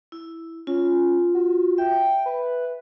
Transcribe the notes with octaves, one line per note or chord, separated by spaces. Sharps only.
E4
C#4 F4
F#4
E5 G5
B4